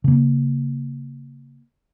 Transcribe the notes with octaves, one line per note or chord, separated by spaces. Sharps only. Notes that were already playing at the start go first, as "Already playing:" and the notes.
C#3 A#3